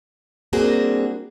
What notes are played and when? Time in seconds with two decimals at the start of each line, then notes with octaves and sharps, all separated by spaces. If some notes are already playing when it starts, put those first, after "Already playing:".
0.53 G3 A#3 C4 D4 F#4 G#4